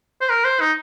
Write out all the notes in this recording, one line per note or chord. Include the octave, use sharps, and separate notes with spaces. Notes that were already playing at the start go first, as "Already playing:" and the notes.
C5
A#4
C5
D#4